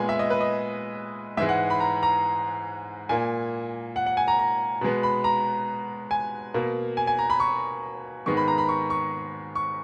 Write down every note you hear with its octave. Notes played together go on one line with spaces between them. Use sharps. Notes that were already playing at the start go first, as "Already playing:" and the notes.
Already playing: A#2 G#3 B3 G#5
E5
D#5
B4
D#5
G#2 E3 G#3 E5
F#5
B5
A#5
A#5
A#2 A#3 G#5
F#5
F#5
G#5
A#5
A#5
B2 G#3 B3
B5
A#5
G#5
B2 A#3
G#5
G#5
A#5
B5
C#6
G#2 D#3 G#3 B3 C#6
B5
A#5
B5
C#6
C#6
C#6